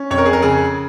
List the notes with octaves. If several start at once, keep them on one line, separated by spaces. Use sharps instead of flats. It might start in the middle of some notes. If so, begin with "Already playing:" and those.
Already playing: C#4
F2 C#5
A#4
G#4
A#4
C#3 G#4